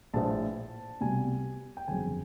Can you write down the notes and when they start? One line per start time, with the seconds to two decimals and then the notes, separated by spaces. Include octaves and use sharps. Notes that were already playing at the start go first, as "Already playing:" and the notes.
0.13 A#1 A2 F3 A5
1.01 C2 B2 G3 G#5
1.77 G5
1.87 G1 F2 C#3 F#3 G#5